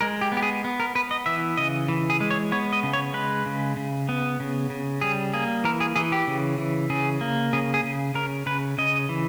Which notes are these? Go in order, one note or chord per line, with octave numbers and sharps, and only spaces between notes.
G#3 A#4
G4
B3
G4
G#4
B3
A#4
B3 B4
D#5
E3 E5
C#3 D#5
E3
G#4
G#3
C#5
B3 C#5
D#5
C#3
C#5
G#3 B4
C#3
C#3
B3
C#3
C#3
G3 G#4
A#3 G#4
E3 A#4
G#4
E3 G#4
G4
C#3
E3
C#3 G#4
A#3
C#3 G#4
G#4
C#3
C#3 A#4
C#3 B4
C#3 D#5
E3